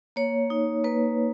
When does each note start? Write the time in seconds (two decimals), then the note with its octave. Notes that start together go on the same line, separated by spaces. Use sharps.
0.16 A#3 C#5
0.50 D#4
0.84 A#3 B4